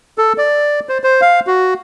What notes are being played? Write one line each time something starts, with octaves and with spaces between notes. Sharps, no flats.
A4
D5
C5
C5
F5
F#4